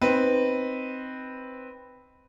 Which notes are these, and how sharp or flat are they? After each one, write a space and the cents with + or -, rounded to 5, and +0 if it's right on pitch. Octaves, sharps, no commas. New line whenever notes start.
C4 +0 D#4 +0 B4 +0